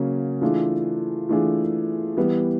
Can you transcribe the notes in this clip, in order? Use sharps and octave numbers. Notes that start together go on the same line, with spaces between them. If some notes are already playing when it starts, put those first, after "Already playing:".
Already playing: C#3 F#3 A#3 C#4
E3 A3 D4 F4 G#4
E3 A3 D4 F4 G#4
E3 G3 B3